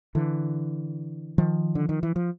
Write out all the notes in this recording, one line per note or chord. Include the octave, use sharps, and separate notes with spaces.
D3 E3
D#3 F3
D3
D#3
E3
F3